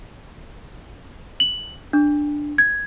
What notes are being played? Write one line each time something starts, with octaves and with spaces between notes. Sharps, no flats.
F#7
D4
G#6